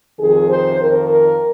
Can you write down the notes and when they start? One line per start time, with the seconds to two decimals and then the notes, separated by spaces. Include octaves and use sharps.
0.19 F2 C3 D#3 G#4
0.49 C5
0.79 F2 D#3 A#4
1.10 A#4